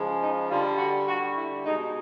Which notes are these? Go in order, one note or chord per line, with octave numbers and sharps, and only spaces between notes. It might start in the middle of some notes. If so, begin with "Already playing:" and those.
Already playing: C#3 F3 G#3
D#4
D3 G3 F4
F#4
D3 G3 F#4
E4
B2 G#3 D#4